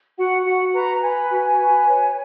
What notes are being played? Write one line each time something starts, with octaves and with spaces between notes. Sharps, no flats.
F#4 F#5
F#4 F#5
B4 A#5
A#5
B4 G#5
F#4
B4
C#5